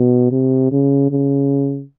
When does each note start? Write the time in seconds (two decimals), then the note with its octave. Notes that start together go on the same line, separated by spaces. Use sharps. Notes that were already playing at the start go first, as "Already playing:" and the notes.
Already playing: B2
0.32 C3
0.72 C#3
1.11 C#3